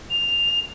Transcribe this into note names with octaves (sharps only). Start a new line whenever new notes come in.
F7